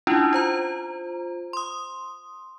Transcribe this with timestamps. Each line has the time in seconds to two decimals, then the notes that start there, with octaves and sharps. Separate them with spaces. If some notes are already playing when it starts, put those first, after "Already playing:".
0.07 C#4 D4 E4 F4
0.33 F4 C5 A#5
1.53 C6 D#6